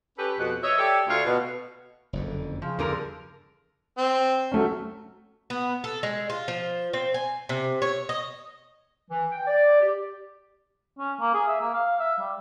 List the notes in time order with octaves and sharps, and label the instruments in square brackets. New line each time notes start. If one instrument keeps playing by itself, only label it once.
[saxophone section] C#4 G4 A4 B4
F2 B2 F#5
C#5 D#5 E5
G4 A4 C#5 D5 E5
D2 A3 D4 F4 C#5 F5
B2
[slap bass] F#1 F2 D3
[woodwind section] C#3 [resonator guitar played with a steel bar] F3
[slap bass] E2 G2 [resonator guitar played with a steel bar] D3 F3 A#4
[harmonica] C4
[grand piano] F#3 A3 C#4
[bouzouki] B3
A4
G#3
F4
F3
C4
G#5
C3
C#5
D#5
[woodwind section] E3
G5
D5
G4
[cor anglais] C#4
A#3
G#4
E5
A#3
F5
E5
G3